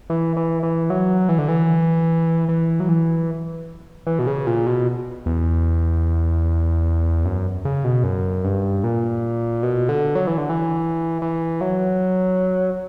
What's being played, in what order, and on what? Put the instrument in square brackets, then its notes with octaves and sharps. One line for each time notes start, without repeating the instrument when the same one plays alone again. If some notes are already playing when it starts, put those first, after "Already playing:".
[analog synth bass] E3
E3
E3
F#3
E3
D3
E3
E3
F#3
E3
E3
B2
C#3
A#2
B2
E2
F#2
C#3
B2
F#2
G2
A#2
B2
D3
F#3
E3
D3
E3
E3
F#3